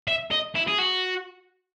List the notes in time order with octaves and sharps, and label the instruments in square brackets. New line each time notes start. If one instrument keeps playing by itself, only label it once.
[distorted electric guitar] E5
D#5
E4
G#4
F#4